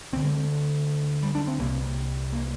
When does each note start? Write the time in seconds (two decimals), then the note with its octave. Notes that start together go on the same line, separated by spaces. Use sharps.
0.12 D2 C4
0.16 D3
0.25 G#3
1.22 G3
1.35 D4
1.47 C4
1.59 C2 C3 A#3
2.32 A#3